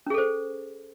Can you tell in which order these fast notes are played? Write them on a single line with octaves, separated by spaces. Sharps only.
C#4 G#4 A4 C5